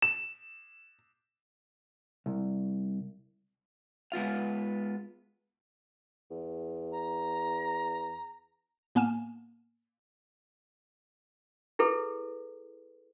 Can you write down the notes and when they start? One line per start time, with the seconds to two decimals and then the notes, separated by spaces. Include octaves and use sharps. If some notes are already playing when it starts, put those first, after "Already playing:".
0.02 E7
2.26 C2
4.12 G#3 B3 F4 F5
6.30 E2
6.91 A#5
8.95 A2 A#3 B3 G#5 F6 E7
11.79 E4 G#4 A4 B4